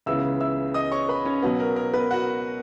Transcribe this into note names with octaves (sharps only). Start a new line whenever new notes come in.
C#2 C#3 E3 B3 E5 E6
E5 E6
D#5 D#6
C#5 C#6
B4 B5
C#4 C#5
B2 F#3 B3
A#4
A#4
B3 B4
F#4 F#5